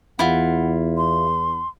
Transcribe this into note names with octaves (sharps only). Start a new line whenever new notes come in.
E2 E4 F4 F#5
C6